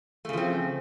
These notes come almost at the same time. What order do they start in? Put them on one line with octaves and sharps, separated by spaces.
A3 C#3 F3 C4